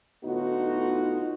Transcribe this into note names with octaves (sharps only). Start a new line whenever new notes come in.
A2 D3 B3 D#4 F4 F#4